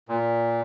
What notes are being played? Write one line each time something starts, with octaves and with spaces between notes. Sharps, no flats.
A#2